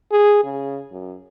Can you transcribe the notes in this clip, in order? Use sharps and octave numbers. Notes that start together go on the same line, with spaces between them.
G#4
C#3
F#2